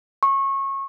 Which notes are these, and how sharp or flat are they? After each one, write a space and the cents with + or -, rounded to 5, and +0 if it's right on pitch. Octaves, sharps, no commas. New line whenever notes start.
C#6 -25